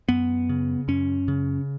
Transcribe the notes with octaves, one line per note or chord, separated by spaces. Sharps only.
F#2 B3
C#3
F#2 C#4
C#3